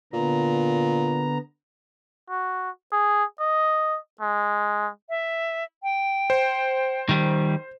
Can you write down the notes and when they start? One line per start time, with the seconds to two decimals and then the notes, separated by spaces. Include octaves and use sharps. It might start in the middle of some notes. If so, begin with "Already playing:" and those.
0.13 A#2 D3 B3 A#5
2.30 F#4
2.92 G#4
3.40 D#5
4.21 G#3
5.09 E5
5.83 G5
6.30 C5
7.09 D#3 G3